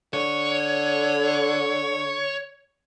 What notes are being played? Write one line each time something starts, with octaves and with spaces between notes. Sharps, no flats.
D3 C#5